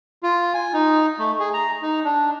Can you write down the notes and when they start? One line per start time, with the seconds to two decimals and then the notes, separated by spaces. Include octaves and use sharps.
0.23 F4
0.54 G#5
0.73 D#4
1.19 A3
1.39 G#4
1.54 A#5
1.82 D#4
2.04 D4